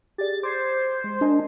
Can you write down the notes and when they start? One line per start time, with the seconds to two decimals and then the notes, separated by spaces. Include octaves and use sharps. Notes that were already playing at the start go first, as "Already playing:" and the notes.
0.18 G4 G#4 D5 A6
0.43 C5 D6 G#6 C7
1.04 G#3
1.21 D4 A#4 D#5 G#5